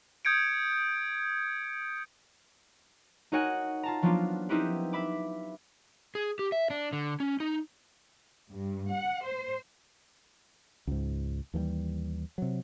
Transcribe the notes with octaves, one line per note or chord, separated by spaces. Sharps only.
D#6 G6 G#6 C#7 D7
D#4 F#4 A#4 C#5 F#5 G#5
F4 A5 A#5
F3 F#3 A#3 B3 D4 F4
C4 D#4 E4 G4 A#4 B4
E5 B5 D6
G#4
G4
E5
D4
D3
C#4
D#4
G2
F#5
C5
C#2 G#2
D#2 E3 F3 G3
C3 F#3